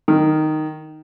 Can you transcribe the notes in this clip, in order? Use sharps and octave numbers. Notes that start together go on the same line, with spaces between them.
D#3